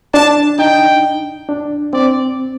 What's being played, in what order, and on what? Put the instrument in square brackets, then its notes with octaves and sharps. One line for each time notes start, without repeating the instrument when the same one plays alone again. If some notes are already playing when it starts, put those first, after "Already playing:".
[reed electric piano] D4 [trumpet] A5
[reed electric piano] D#4 [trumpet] G5
[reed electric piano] D4
[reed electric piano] C4 [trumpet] D5